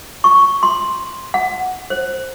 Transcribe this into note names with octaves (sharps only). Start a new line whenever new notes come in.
C#6
C6
F#5
C5